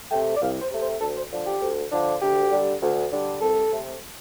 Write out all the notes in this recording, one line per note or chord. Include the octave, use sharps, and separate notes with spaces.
C3 A3 G5
D5
C2 F5
C5
C3 A3
C5
D2 A4
C5
D3 F3 D4
G4
D2
D3 F3 D4
D2 G4
D3 G3 D4
D2
D3 G3 D4
C2 A4
C3 A3